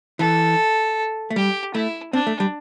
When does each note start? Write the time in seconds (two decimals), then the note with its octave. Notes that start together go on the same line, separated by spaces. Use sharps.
0.19 E3 A4
1.30 A3
1.36 G3 G4
1.74 A3 E4
2.13 C4 D4
2.27 A3
2.40 G3